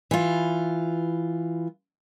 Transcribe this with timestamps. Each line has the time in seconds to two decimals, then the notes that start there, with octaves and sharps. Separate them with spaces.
0.11 E3 F4